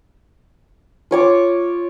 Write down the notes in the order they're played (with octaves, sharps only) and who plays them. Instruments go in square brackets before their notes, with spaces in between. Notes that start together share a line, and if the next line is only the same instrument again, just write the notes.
[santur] F4 C#5 D6